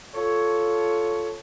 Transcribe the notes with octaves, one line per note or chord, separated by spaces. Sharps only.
F4 A4 C#5